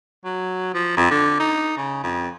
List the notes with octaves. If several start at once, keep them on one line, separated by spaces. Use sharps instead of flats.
F#3
F3
F2
D3
D#4
C#3
F2